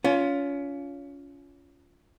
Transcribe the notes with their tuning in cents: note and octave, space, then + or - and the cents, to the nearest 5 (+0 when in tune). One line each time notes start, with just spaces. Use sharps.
C#4 +30 F4 +0